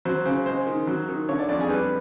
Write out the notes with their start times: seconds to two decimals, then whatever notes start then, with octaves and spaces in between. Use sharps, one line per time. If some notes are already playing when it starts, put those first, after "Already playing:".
0.05 F#3 C5
0.25 C#3 C5
0.46 G#3 C5
0.67 D#3
0.87 F#3
1.09 D#3
1.29 D3 C#5
1.39 D5
1.49 F2 D5
1.60 G#4
1.69 G3 B4